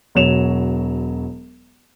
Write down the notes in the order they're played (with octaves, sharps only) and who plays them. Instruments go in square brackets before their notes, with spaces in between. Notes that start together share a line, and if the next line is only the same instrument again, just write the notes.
[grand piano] E1 F#3 C#5 E7 F7